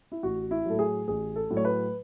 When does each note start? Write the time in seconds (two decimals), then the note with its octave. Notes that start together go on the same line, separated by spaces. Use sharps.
0.12 E4
0.23 A1 F#4
0.51 E4
0.66 A2 F#3 A4
0.79 G#4
1.08 A1 G#4
1.36 A4
1.50 A2 F#3
1.57 C#5
1.65 B4